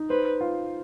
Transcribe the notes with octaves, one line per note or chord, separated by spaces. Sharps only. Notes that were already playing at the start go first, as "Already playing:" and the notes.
Already playing: D#4
B4 C5
F4